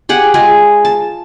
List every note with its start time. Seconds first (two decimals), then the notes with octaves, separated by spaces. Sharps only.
0.09 G4 G#4 F#5
0.34 G#3 F4 G#4
0.85 A5